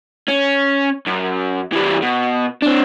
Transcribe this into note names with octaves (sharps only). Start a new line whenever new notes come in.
C#4
F#2
E3 G3
B2
C4 D4